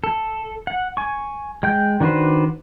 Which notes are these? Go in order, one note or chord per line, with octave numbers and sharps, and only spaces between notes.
A4
F#5
G#5 C#6
G#3 G5 G6
D#3 D4 F#4 B4 C5